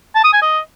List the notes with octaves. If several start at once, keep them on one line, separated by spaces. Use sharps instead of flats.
A5
D#6
G#5
D#5